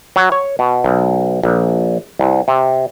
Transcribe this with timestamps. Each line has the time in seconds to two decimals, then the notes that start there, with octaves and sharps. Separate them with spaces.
0.16 F#3
0.32 C#5
0.59 B2
0.84 B1
1.43 A#1
2.19 C2
2.48 C3